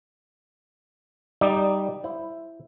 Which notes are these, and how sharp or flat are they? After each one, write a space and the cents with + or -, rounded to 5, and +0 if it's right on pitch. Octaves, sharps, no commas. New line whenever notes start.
G3 -5 D#4 +0 D5 +10
E4 +5 C5 +0